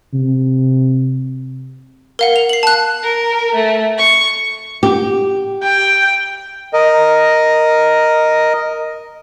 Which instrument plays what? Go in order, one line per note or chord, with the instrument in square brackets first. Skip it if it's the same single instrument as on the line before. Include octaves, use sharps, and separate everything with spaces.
[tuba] C3
[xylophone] A#4 F5 F#5
F7
C7 F#7
A5 F#6
[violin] A#4
A3
C#6
[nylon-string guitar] G4
[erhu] G5
[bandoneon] A#4 D#5